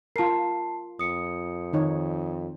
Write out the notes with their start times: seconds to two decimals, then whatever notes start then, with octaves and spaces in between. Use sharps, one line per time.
0.16 F4 A#4 A5 C7
0.99 F2 D#6 C#7
1.73 D#3 D#4 C#5